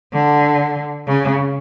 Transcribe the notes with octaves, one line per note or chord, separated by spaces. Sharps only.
D3
C#3